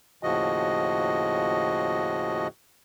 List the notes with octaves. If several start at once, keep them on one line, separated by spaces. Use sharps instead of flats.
D#2 A2 C#3 F3 F#4 D#5